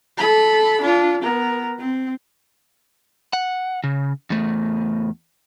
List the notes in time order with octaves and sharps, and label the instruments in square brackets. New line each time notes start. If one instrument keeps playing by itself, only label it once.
[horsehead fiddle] A4 B5
D4 F4
B3 A#4
C4
[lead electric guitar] F#5
C#3
E2 A3